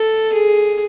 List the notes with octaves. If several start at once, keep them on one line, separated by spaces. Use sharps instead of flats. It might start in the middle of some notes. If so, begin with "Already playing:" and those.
Already playing: A4
G#4